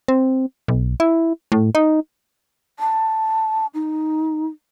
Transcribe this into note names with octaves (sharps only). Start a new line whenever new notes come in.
C4
B1
E4
A2
D#4
A5
D#4